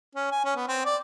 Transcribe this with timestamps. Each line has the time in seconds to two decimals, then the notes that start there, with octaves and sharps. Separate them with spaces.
0.16 C#4
0.31 G#5
0.45 C#4
0.56 B3
0.68 C4
0.85 D5